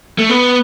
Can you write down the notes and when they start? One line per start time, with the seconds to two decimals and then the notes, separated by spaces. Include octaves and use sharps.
0.18 A3
0.29 B3